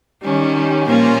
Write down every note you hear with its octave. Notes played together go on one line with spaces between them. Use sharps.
D#3 G3 C#4
A#2 F3 A#3 C#4 F4